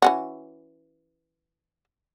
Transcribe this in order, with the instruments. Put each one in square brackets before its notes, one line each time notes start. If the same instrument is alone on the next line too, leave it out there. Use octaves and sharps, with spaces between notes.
[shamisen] E3 C#4 F#4